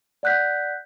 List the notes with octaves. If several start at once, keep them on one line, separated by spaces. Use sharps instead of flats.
D5 F#5 F#6 G6 B6